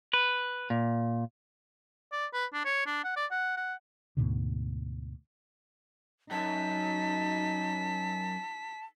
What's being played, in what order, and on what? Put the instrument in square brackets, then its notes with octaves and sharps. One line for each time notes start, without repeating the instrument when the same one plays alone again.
[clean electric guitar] B4
A#2
[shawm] D5
B4
D4
C#5
D4
F#5
D5
F#5
F#5
[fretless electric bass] D2 G#2 B2 D3
[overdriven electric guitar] F#2 [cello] D#4 [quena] A5 [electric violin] B6